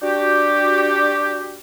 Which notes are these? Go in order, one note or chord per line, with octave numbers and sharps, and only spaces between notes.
D4 F#4 G4